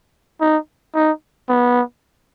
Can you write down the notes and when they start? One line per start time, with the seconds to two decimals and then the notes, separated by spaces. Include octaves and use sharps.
0.41 D#4
0.95 D#4
1.49 B3